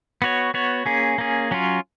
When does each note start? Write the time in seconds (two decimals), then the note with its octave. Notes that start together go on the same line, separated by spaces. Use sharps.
0.22 B3 F#4 C#5
0.54 B3 F#4 C#5
0.86 A#3 C#4 G#4
1.18 A#3 C#4 G#4
1.51 F#3 C#4 F4